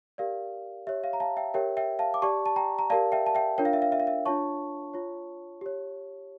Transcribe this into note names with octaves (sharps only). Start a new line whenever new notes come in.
G4 A#4 D5 F5
G4 C#5 E5
F5
A#5
F5 A5
E5 G5
G4 A#4 C#5 E5 G5
E5 G5
F5 A5
D6
G4 D5 A5 C#6
A5
G5 A#5
A#5
G4 A#4 D5 F5 A5
E5 G5
A5
E5 G5
D4 F4 A#4 C#5 G5
F5
E5
F5
E5
F5
E5
D4 F4 C#5 A5 C#6
F4 C#5
G4 C#5